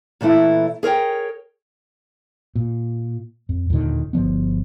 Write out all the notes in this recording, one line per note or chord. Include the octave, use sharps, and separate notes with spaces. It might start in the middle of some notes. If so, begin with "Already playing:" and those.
A#2 E3 A3 E4
G#4 A#4 C#5 G5
A#2
F2
D#2 A#2 D3 D#3
G1 D3 F3 B3